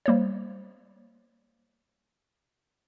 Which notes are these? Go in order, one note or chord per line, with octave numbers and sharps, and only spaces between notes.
G3 A#3 C5 C#5